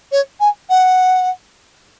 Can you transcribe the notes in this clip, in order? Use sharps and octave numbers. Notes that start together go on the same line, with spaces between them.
C#5
G#5
F#5